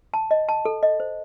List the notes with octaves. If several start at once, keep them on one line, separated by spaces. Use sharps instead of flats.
A5
D#5
A5
A4
D#5
C5